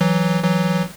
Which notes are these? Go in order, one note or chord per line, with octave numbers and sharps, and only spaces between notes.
E3 F#3
E3 F#3